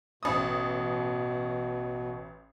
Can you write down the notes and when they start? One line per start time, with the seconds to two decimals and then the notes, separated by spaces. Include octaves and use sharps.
0.23 A1 B2 D#6